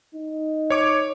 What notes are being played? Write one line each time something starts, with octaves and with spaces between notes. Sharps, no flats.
D#4
C#5 D6